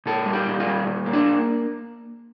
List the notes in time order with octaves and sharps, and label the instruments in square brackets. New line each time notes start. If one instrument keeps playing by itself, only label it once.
[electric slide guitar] A#2 A4
G3
G4
A#2
F4
G3
A#2
A#3
D4
A#3